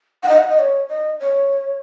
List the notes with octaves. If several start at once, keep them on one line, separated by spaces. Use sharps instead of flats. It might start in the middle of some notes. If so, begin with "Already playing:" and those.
F#5
D#5
F#5
D#5
C#5
D#5
C#5